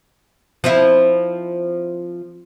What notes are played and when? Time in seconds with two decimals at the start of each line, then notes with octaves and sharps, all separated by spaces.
0.64 F3 C4 E4